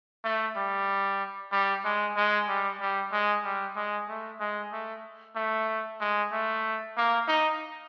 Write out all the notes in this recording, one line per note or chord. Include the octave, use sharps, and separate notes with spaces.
A3
G3
G3
G#3
G#3
G3
G3
G#3
G3
G#3
A3
G#3
A3
A3
G#3
A3
A#3
D#4